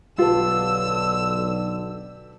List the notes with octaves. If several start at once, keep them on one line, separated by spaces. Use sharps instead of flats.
B1 D3 F4 G4 B4 A5 E6